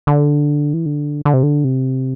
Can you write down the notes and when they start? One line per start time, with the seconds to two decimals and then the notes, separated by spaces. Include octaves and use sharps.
0.07 D3
0.73 E3
0.86 D3
1.25 D3
1.34 C3
1.43 D3
1.64 C3